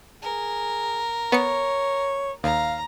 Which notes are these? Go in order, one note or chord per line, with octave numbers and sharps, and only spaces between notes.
G#4 A#4
B3 C#5 C#7
D#2 F5 A#5